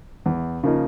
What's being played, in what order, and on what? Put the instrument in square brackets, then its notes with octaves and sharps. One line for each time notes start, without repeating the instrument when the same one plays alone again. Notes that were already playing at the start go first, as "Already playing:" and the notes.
[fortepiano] E2
C#3 F3 A#3 D#4